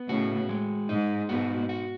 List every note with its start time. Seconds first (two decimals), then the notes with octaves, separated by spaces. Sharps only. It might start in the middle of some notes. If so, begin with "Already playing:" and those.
Already playing: B3
0.09 A2 C#3 F#4
0.49 G#3
0.89 G#2 D#4
1.29 G#2 B2 F#4
1.69 F#4